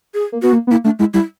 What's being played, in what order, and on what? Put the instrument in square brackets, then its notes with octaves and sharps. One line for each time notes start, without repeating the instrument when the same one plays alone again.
[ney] G#4
[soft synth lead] A#3
[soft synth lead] B3 [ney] F#4
[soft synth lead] A#3
B3
[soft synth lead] A#3 [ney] E4
[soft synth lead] A3 [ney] D4
[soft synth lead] G#3 [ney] E4
[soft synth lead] G3 [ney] E4